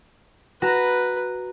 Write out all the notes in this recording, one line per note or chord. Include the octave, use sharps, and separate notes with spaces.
F#4 B4 A#5